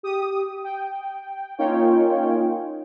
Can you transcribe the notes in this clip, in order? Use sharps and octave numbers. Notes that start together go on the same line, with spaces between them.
G4 D#6
G5
A#3 C#4 D#4 F4 C#5 G5